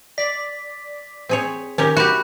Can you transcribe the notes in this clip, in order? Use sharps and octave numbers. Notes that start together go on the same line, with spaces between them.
D5 B6
C4 G#4 C#5
D#3 C#4 G4 A#4
F#4 G4 B5 F#6